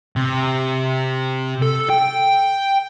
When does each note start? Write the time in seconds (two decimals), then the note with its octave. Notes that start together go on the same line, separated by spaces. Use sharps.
0.16 C3
1.62 A4
1.90 G5